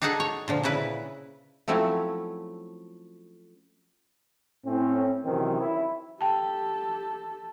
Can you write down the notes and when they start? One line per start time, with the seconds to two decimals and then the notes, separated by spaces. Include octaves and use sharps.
0.02 D4 D#4 G#4 A4 F#5 G#5
0.20 C#5
0.48 A#2 D3 F3
0.63 A#2 C#3 E4 B4
1.68 F3 F#3 A3 C4 C#4 E4
4.66 A2 C4 C#4
5.25 C3 D#3 E3 F#3 C4 C#4
5.61 E4
6.21 G4 A4 G5 A5